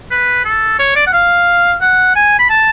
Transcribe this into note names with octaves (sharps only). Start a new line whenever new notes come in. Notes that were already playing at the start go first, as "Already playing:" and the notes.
B4
A4
C#5
D5
F#5
F5
F#5
G#5
B5
A5